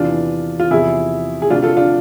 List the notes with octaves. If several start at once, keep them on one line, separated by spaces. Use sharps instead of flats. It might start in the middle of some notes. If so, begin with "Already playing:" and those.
Already playing: E2 C3 E3 D4 F4
F4
E2 C3 F3 E4 G#4
G#4
D2 C3 F3 D4 F4
F4 A4
D4 F4